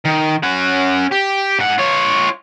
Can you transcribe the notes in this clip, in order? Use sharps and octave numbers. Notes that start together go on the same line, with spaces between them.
D#3
C#4 F#5
G4
G#2 F#5
F4 C#5